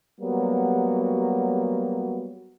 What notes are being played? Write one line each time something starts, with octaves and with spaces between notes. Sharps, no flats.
F#3 G3 A#3 B3 F#4